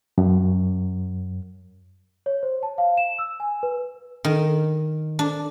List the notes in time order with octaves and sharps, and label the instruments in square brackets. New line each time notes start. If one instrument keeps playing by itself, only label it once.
[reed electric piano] F#2
[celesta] C#5
C5
A5
F5
E7
E6
G#5
B4
[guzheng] D#3
D4